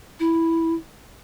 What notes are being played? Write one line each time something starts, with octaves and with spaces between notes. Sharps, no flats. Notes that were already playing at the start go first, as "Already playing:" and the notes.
E4